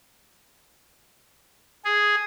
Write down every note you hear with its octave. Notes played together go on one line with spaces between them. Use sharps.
G#4